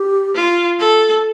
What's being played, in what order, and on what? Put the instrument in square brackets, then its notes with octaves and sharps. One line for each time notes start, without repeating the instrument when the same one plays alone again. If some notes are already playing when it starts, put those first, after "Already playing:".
Already playing: [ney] G4
[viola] F4
A4